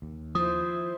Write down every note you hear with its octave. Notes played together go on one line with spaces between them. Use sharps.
D#2
F3 E4 C5 D#6